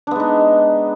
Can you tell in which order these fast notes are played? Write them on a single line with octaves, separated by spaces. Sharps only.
D4 B3 G#3 D#4